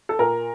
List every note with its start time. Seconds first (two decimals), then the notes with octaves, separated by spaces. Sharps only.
0.09 A4
0.19 A#2 A#4